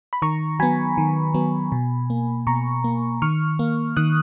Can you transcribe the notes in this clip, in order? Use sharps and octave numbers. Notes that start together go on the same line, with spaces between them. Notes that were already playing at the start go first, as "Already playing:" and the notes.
B5
D#3 A#5 C#6
F#3 B3 G#5 B5
D#3
F#3 B3
B2
A#3
B2 A#5 C#6
A#3
D#3 C#6 F6
A#3
D#3 D#6 F#6